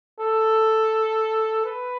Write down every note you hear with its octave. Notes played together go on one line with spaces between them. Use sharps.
A4
B4